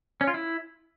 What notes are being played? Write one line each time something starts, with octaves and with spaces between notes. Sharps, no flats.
C#4
F4
E4